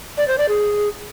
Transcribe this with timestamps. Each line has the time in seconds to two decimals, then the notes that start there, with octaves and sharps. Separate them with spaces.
0.18 D5
0.28 C5
0.38 D5
0.49 G#4